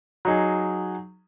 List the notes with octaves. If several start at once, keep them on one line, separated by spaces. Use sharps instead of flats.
F#3 D#4 G#4